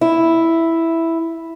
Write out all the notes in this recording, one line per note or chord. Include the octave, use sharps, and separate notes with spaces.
E4